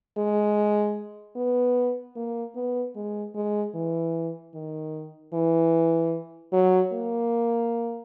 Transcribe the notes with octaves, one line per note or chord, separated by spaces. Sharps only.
G#3
B3
A#3
B3
G#3
G#3
E3
D#3
E3
F#3
A#3